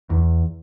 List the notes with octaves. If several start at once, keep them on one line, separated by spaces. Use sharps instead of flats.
E2